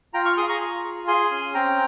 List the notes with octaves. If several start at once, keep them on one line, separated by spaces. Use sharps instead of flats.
F4 G5 A#5
C#6 F6
G#4 C6 D#6
A#5 C#6
F4
G#4
G#4 G#5 C6
C#4
C4 G5 A#5